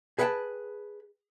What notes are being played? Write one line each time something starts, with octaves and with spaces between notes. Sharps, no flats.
G#4 B4 E5 F#5 G5 A5